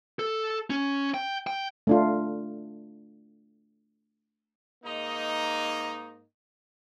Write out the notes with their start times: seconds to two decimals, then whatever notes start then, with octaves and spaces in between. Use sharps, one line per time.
0.19 A4
0.70 C#4
1.14 G5
1.47 G5
1.87 A3 D4 F4
4.84 G#2 A#3 D#4